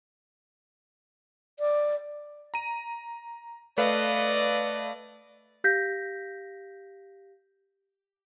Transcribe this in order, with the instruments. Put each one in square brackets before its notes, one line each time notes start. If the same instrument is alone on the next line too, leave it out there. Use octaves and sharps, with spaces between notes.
[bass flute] D5
[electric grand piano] A#5 D#7
[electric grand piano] A3 B4 F5 [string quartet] D5 D#5
[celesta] G4 F5 G6 A#6 B6